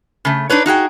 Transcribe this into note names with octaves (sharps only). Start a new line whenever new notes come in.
C#3 A3
D4 D#4 B4 C#5
D#4 F#4 G#4 G5